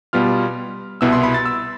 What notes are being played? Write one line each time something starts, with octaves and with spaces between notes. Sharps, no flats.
B2 G3 B3 F4 F6
C2 B2 B3 E4 E6
C6
B5
A6
E6